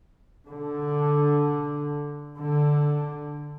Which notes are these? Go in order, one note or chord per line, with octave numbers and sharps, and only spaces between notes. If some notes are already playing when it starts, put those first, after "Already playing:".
D3
D3